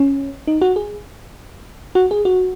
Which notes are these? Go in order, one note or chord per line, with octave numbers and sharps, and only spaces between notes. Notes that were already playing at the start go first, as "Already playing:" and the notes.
Already playing: C#4
D#4
F#4
G#4
F#4
G#4
F#4